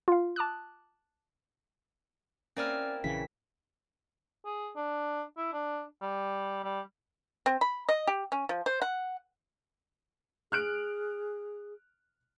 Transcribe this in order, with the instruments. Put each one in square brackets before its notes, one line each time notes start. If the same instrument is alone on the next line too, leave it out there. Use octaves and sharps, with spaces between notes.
[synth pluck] F4 F5
A5 D6 D#6 F#6
[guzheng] A#3 C4 E4 [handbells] C#4 D5 F6
[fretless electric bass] A#1 C#3 E3 [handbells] B6
[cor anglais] G#4
D4
E4
D4
G3
G3
[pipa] C4
B5
D#5
G4
C#4
F3
C5
F#5
[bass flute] G#4 [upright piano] F6 F#6 D7